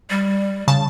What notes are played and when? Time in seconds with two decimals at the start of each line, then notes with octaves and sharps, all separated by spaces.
0.10 G3
0.68 C#3 A5